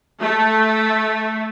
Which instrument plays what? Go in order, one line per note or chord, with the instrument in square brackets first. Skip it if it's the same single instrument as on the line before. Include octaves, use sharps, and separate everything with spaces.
[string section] A3